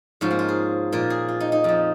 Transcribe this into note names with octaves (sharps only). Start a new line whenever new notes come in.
G#2 F3 C#4
A#3
F4
G#4
A#2 F3 A#4
G#4
F4
D#4
D#4
F2 F3